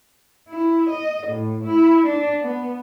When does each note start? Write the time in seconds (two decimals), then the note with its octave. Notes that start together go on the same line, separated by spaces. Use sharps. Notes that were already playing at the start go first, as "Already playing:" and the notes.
0.49 E4
0.90 D#5
1.27 A2
1.64 E4
2.06 D4
2.41 B3